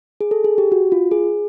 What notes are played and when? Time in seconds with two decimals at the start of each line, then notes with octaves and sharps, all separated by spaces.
0.21 G#4
0.31 A4
0.44 G#4
0.58 G4
0.72 F#4
0.92 F4
1.11 G#4